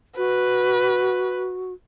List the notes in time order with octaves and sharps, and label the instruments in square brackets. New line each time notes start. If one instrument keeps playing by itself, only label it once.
[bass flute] F#4 [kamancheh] B4